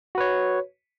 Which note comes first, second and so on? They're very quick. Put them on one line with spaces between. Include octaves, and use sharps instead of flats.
F#4 B4 C#5